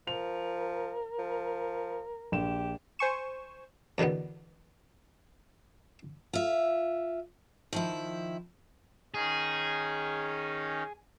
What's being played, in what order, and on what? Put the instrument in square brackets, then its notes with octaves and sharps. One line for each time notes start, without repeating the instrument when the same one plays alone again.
[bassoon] F3 [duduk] A#4 [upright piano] F7
[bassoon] F3
[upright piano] A#1 E7 [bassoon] G4
[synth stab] C5 G#5 C#6 E7
[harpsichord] E2 B2 D3 D#3 B3
[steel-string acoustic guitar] F4 E5
D#3 F3 E4
[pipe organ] D#3 C#4 D#4 [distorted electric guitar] G#4